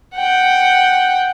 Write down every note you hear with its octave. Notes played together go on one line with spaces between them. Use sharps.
F#5 G5